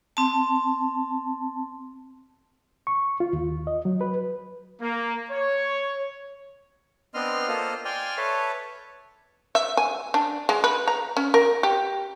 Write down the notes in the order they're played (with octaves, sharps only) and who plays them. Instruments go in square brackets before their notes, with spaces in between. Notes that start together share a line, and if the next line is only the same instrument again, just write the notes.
[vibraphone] C4 A5
[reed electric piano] C#6
F4
D#2
D#5
F#3
B4
[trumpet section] A#3
C#5
[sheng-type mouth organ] B3 C4 D4 D#5 C6 F6
A#3 F4 A4 C5 D#5 F6
D5 G5 G#5 C6 F6
A4 B4 C#5 E5 A5
[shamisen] E5
G#5
D4
G#3
B4
A#5
C#4
A#4
G4